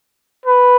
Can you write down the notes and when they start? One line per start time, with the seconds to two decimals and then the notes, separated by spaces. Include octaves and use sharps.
0.45 B4